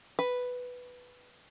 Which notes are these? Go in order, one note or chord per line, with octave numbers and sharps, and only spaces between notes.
B4